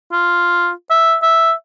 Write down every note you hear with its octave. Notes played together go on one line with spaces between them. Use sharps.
F4
E5
E5